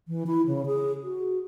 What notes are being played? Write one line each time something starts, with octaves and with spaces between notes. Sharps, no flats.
E3
E4
C#3
G#4
F#4